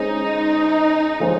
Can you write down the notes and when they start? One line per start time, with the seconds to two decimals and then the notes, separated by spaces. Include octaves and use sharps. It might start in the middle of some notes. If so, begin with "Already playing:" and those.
Already playing: G#3 C#4 D#4 G#4 C5
1.20 F3 G#3 C#4 G#4 C5